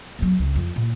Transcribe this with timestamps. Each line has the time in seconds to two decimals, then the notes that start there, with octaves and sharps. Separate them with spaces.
0.19 E2 F#3
0.39 C#2
0.55 F2
0.76 A#2